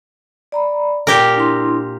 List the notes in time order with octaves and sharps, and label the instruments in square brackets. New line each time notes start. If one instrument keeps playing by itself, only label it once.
[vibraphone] D5 A#5 B5
[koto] A#2 G4 A#4 [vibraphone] G5
[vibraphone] D4 E4 C6